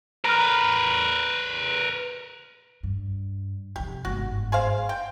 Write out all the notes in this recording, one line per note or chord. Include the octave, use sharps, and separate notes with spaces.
A#4 B4 A#5 F6
G2
F2 C3 G4
G1 G#2 F#4
G#4 C5 F5
G5